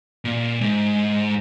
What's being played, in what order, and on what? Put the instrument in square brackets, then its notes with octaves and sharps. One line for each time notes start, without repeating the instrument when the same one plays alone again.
[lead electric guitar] A#2
G#2